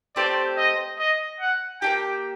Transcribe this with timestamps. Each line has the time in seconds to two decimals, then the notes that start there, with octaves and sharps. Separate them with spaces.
0.16 A3 C4 G4 C5 D5
0.57 D#5
0.99 D#5
1.41 F#5
1.81 A#3 D4 G4 G5